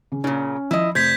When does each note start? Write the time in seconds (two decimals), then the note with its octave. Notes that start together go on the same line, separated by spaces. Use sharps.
0.12 C#3
0.24 A#2 C#3 C#4
0.71 F3 E4 D#5
0.95 F1 C5 G6 G#6 B6